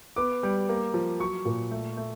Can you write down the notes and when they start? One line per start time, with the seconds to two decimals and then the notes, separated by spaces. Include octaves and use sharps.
0.16 B3 D6
0.43 G3
0.69 A#3
0.94 F3
1.19 F#3 C#6
1.45 A#2
1.71 A3
1.97 A3